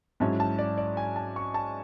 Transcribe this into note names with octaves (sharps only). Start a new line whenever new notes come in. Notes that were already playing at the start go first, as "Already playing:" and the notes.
G#2 F#3 C#4 E4 A5
A5
D5
D5
G#5
A5
C#6
A5